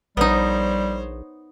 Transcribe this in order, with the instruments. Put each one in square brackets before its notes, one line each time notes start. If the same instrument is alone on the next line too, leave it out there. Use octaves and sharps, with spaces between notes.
[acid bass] A#1 [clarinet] G3 [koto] B3 D#4 [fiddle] C5 C#5